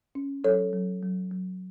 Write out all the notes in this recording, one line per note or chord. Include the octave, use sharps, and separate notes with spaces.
C#4
F#3 A4 C#5
F#3
F#3
F#3